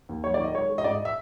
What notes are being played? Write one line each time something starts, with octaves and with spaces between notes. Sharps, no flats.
D#2
F#3 C#5
D5
D#3 D#5
G#3 C#5
G#3
D#5
G#2 D5
D#5
E5